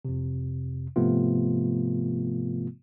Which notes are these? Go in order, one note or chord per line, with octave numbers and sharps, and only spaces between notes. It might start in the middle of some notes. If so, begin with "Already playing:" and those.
F2 C3
G#2 C3 F3 A3 B3 F4